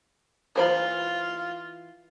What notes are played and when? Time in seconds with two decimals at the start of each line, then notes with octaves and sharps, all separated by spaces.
0.56 E3 F4 C5 B5